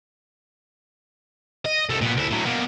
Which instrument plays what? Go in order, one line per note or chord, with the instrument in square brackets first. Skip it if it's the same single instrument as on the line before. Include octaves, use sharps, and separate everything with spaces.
[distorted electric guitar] D#5
C2 A3
A#2 B3
D2 E4
A2 F#3
B2 A#3